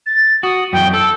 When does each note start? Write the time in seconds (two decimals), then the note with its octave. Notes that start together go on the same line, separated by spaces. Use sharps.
0.06 A6
0.43 F#4 D#6
0.73 F#2 E3 G5
0.93 A4 E6